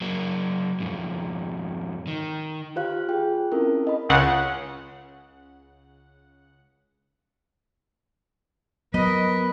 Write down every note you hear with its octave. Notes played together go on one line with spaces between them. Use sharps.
F#3 A#3
F2 G#2
D#3
F4 G4 C5 F5 F#6
F4 G#4 G5
C4 C#4 E4 A4 A#4
A4 D#5 B5
C#2 C#3 F#5
F#3 B3 A#4 B4 D#5